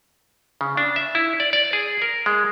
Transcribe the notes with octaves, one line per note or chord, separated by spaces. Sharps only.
C#3
D4
E5
E4
D5
D5
G#4
A#4
G#3